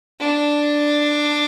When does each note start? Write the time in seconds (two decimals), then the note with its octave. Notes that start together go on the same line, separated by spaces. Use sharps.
0.20 D4